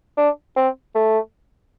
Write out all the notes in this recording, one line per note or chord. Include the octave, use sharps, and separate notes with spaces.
D4
C4
A3